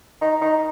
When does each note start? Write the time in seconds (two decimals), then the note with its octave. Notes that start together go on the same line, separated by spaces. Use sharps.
0.21 D#4
0.41 D#4